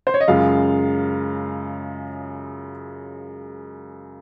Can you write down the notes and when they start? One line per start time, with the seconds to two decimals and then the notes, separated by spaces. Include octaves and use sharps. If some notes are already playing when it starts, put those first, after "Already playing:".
0.07 C5
0.14 C#5
0.21 D#5
0.27 F#2 C#3 G#3 F4 F5